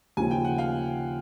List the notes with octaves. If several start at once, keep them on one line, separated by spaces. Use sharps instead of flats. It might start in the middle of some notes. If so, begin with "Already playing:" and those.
D#2 C#3 F3 G#5
G5
F#5
F5 G5